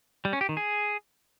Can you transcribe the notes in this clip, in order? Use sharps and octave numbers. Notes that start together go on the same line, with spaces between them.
G3
C#4
G4
D#3
G#4